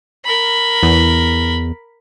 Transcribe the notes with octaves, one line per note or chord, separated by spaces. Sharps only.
A#4 B5
E2